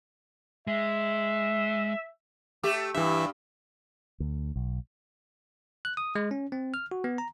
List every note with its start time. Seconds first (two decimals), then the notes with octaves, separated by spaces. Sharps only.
0.67 G#3 E5
2.63 A3 G4
2.95 G2 E3 E5
4.20 D2
4.56 B1
5.85 F#6
5.97 D#6
6.15 G#3
6.31 C#4
6.52 C4
6.74 F6
6.91 F#4
7.04 B3
7.18 A#5